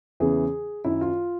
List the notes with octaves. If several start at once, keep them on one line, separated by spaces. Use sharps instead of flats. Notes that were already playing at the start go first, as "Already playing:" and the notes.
E2 C#3 E3 G#4
F#2 D#3 E4
F4